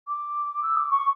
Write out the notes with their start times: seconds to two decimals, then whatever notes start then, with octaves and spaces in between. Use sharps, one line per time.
0.08 D6
0.62 E6
0.76 D6
0.90 C#6